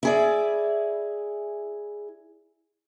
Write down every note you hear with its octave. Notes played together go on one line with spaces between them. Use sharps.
E4 G#4 D5